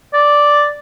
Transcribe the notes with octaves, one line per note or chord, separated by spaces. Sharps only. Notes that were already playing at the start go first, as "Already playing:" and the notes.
D5